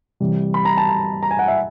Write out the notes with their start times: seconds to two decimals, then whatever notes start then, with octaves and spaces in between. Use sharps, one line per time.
0.20 C3 E3 G3
0.54 B5
0.65 A#5
0.77 A5
0.89 A#5
1.23 A#5
1.31 G#5
1.39 F#5
1.48 E5